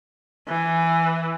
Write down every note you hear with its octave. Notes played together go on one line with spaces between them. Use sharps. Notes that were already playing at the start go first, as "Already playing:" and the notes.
E3